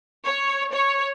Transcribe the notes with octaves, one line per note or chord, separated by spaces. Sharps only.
C#5
C#5